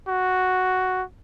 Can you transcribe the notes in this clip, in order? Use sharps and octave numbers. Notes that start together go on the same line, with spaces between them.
F#4